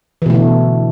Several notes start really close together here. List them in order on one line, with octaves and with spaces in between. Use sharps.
E3 B2 A3 D3